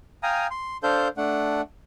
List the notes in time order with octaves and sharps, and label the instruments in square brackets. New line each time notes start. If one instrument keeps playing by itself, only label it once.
[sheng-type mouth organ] F5 G5 G#5 A#5 D#6
C6
D4 A4 C5 F5 G6
A3 D4 F#5